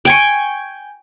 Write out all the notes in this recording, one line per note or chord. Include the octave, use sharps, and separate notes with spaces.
G5 G#5 C#6